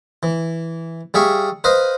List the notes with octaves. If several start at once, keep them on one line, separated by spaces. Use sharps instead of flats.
E3
G3 G#4 E5 F5 C#6
B4 C5 D#5 F5